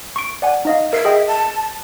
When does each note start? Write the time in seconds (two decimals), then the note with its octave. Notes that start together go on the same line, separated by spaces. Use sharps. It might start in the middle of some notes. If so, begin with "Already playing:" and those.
0.16 C#6 D7
0.42 D5 F#5 G#5
0.65 D#4 D#5 F5
0.93 A#4 E5 C7
1.05 G#4 D#5 G5
1.28 A5